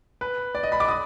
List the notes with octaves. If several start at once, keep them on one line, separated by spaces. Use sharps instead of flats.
B4
D5
D#5
B5
D6
D#6